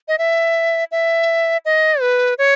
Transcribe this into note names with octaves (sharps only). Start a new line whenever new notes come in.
D#5
E5
E5
D#5
B4
C#5